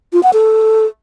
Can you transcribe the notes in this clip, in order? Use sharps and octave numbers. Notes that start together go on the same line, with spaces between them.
F4
F#5
A4